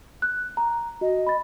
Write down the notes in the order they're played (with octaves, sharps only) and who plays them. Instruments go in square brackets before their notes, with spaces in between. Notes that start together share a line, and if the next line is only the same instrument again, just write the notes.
[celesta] F#6
A#5
[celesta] F#4 [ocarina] D#5
[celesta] B5 A6